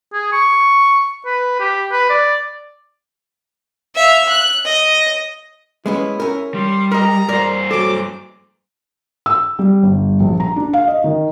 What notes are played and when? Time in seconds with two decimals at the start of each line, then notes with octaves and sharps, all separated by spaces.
0.13 G#4
0.33 C#6
1.26 B4
1.60 G4
1.92 B4
2.10 D5
3.96 E5 F5
4.29 F#6
4.65 D#5
5.86 G#3 B3 C#4 E4
6.20 C#4 A#4
6.54 G3 C6
6.92 A#4 D#5 A#5
7.29 G2 A#4 C5 D5
7.71 F#3 A4 D6
9.26 E6
9.59 G3
9.83 G1
10.20 A#1
10.40 A#5
10.56 D4
10.73 F5
10.88 D#5
11.04 D#3